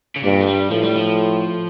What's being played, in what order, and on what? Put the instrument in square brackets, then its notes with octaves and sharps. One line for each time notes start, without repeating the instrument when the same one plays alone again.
[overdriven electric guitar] C#3
[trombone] G2 [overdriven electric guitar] A#2
[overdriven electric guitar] A3
G3
[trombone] A2 [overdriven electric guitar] F3
[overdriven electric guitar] G3
F3